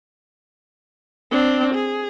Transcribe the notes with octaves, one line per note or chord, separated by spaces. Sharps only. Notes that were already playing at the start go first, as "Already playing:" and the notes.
C4 D4
G#4